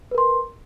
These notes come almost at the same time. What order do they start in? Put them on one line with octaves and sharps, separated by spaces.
B4 A#4 C6